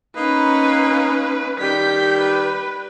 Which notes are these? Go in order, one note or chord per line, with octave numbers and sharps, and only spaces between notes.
A#3 C#4 D#4 B4
D#3 G3 G4 G6 B6
B4